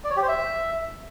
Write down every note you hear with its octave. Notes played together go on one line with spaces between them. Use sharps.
D5
C#5
G4
C5
E5